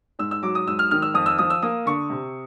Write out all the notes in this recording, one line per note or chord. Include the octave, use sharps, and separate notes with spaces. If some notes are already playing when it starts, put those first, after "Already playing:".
G#2 E6
E6
F#3 D6
D#6
G#2 E6
F6
D#3 F6
E6
F2 D#6
E6
F3 D#6
E6
A#3 D#6
D3 C#6
C3